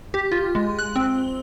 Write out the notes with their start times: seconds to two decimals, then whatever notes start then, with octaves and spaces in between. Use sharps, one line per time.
0.14 G4
0.32 F4
0.55 G#3
0.79 F#6
0.96 C4